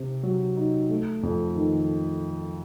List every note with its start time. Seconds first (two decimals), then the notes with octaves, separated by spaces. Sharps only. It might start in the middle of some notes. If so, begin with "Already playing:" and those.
Already playing: C3 C4
0.23 F#3
0.57 D#4
0.90 A3
1.23 F2
1.56 D#3